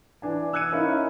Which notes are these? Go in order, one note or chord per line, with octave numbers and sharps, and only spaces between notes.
E3 D4 G#5
E6 F#6 G#6 C#7 D#7
C#4 D#4 E4 A#4 E5 F5